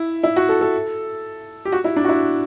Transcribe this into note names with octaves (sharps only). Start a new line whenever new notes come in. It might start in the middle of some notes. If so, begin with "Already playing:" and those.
Already playing: E4
E4
F#4
A4
A4
G4
F#4
E4
D4
F#4
E4